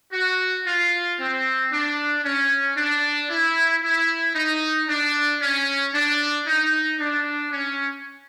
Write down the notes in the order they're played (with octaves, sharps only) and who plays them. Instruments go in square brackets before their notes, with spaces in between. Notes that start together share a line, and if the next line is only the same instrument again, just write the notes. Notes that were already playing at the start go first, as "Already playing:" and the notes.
[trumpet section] F#4
F4
C4
D4
C#4
D4
E4
E4
D#4
D4
C#4
D4
D#4
D4
C#4